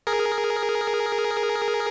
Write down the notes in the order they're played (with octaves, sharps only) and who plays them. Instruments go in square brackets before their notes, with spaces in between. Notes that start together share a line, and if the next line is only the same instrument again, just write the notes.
[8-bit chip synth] G#4 A#4